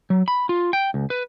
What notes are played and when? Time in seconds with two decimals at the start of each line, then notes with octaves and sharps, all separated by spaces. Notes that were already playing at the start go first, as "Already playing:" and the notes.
0.10 F#3
0.28 B5
0.49 F4
0.73 G5
0.94 C#2
1.10 B4